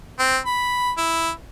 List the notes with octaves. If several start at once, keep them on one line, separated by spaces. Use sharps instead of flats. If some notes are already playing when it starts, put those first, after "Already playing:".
C4
B5
E4